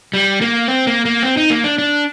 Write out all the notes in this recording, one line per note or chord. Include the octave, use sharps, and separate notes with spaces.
G3
A#3
C4
A#3
A#3
C4
D#4
A#3
D4
D4